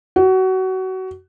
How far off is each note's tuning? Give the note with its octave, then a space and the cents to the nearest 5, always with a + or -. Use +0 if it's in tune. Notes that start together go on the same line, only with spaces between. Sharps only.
F#4 +25